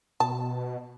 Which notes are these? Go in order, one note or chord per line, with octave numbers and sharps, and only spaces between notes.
B2 A5